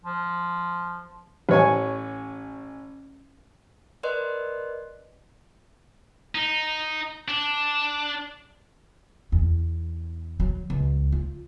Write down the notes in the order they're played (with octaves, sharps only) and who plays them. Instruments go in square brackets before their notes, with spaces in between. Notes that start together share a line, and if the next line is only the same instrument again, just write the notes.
[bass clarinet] F3
[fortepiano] A1 C#5 G#5
[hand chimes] A#4 B4 D5 D#5 C6 F#6
[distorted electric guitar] D#4
D4
[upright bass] E2
F#3
C#2
F4